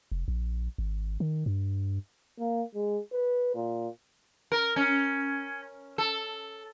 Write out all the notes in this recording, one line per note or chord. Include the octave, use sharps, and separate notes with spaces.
F1
A#1
G#1
D#3
G2
A#3
G#3
B4
A#2
A#4
C#4
A4